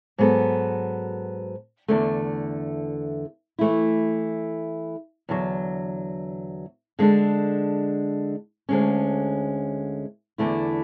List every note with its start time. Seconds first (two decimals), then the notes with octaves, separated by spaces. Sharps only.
0.18 G#2 F#3 B3 F#4 A4
1.88 E2 D3 A3
3.59 E3 A3 E4
5.29 E2 D3 F#3
6.99 D3 G#3 D4 A4
8.69 D2 D3 G#3 C#4
10.38 E2 D3 A3 E4